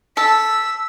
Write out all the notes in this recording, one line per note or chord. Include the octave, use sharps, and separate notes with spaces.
A4 E6 B6